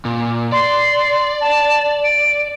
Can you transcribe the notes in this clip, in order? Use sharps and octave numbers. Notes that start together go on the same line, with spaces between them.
A#2
D5 C6
A5
D7